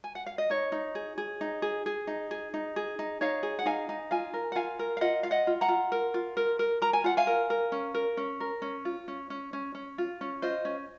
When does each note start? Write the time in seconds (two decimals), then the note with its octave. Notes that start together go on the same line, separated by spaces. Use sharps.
0.04 G#5
0.15 F#5
0.26 F5
0.38 D#5
0.50 D#4 C#5
0.72 D#4
0.95 G#4
1.18 G#4
1.41 D#4
1.62 G#4
1.86 G#4
2.07 D#4
2.31 G#4
2.54 D#4
2.76 G#4
2.99 D#4
3.21 D#4 C#5 F5
3.43 G#4
3.59 F#5
3.66 D#4 F5 G#5
3.89 D#4
4.11 F4 F5 G#5
4.34 A#4
4.52 F#5
4.55 F4 F5 G#5
4.79 A#4
4.97 F5
5.01 F4 D#5 F#5
5.23 F4 F5
5.31 D#5 F#5
5.47 F4
5.61 F#5 A#5
5.68 F4
5.92 A#4
6.14 F4
6.37 A#4
6.59 A#4
6.82 A#4 A#5
6.93 G#5
7.04 F4 F#5
7.17 F5 G#5
7.27 A#4
7.50 A#4
7.72 C#4
7.94 A#4
8.17 C#4
8.40 A#4
8.62 C#4
8.85 F4
9.08 C#4
9.30 C#4
9.53 C#4
9.75 C#4
9.98 F4
10.21 C#4
10.42 F4 C5 D#5
10.65 C#4